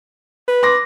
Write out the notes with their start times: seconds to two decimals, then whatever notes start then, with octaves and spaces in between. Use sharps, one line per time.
0.48 B4
0.63 C6 D6 A#6